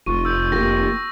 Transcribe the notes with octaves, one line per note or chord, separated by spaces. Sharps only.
F1 F4 C#6 D#7
E6 G6
A#3 G4 A#6